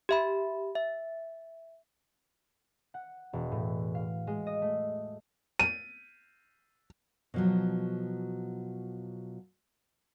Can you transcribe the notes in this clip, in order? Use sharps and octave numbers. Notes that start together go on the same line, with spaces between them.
G4 E5 B5
E5
F#5
E1
A2
F5
G#3
D#5
A3
D#7
B2 F3 F#3